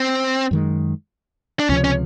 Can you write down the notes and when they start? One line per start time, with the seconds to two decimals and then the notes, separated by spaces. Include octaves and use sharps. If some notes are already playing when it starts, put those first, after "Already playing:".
Already playing: C4
0.51 F#2 D#3 G#3
1.60 D4
1.69 C#2 C3 F3 C#4
1.84 C#4